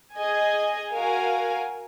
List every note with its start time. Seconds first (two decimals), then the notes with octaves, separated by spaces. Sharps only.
0.18 G#4 D#5 G#5
0.94 F#4 A#4 F5 G#5